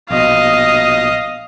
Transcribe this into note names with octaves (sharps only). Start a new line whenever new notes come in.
A#1 B2 D#5 F5